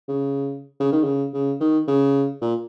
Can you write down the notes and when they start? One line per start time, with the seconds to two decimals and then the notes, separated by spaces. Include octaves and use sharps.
0.08 C#3
0.80 C#3
0.92 D#3
1.04 C#3
1.34 C#3
1.60 D#3
1.88 C#3
2.41 A#2